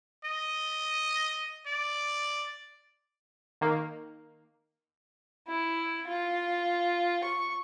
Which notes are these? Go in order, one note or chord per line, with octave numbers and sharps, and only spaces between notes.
D#5
D5
D#3 A#3
E4
F4
C#6